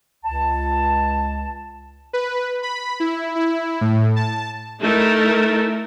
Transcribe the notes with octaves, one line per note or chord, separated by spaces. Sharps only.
C#2 A5
B4
B5
E4
E4
A2
A5
A3 D#4 E4 A4 A#4